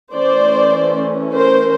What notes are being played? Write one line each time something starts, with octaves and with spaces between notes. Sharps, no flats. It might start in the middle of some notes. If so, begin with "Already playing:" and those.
E3 A3 C#4 C5 D5
A#4 C5